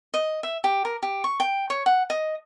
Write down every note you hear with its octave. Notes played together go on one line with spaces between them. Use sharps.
D#5
E5
G4
A#4
G4
C#6
G5
C#5
F#5
D#5